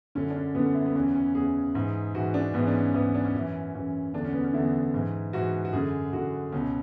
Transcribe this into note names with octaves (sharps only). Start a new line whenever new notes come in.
F#2 D3 C#4
D4
C#4
F#2 D3 B3
C#4
E4
B3
E2 C#3 E3 C#4
C#4
E2 C#3 E3 G#4
G#2 E3
G#2 E3 F#4
D4
G#2 E3 B3
D4
C#4
G#2 E3 B3
C#4
D4
C#4
F#2 E3
F#2 E3 C#4
E2 D3 D4
C#4
B3
C#4
E2 D3 E4
G#2 E3
G#2 E3 F#4
F#4
F#2 D3 G#4
F#2 D3 F#4
C#2 B2 C#4